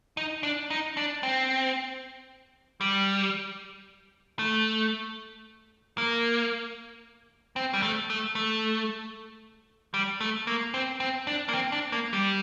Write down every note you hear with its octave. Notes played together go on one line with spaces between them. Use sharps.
D#4
D4
D#4
D4
C4
G3
A3
A#3
C4
G3
A3
A3
A3
G3
A3
A#3
C4
C4
D4
A#3
C4
D4
A#3
G3